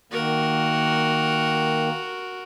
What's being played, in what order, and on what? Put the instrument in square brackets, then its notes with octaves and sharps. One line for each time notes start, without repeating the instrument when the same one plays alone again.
[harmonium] D#3 A#3 [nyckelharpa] F#4 A#4